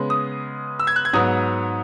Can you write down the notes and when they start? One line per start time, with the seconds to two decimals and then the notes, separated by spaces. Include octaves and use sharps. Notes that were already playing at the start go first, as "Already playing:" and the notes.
Already playing: C#3 G#3 B3
0.10 D#6
0.80 E6
0.87 G#6
0.96 F#6
1.05 G#6
1.13 G#2 F#3 B3 D#6